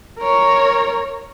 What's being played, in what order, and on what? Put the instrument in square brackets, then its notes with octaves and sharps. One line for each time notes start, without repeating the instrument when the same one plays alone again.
[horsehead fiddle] A#4 C#5